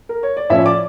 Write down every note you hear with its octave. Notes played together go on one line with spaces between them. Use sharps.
A#4
C#5
D5
A2 F3 C#4 E4 E5
D5 D6